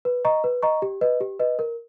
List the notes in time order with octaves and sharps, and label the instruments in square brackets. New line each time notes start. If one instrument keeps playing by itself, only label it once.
[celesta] B4
D#5 A#5 C#6
B4
D#5 A#5 C#6
G4
B4 D#5
G4
B4 D#5
A#4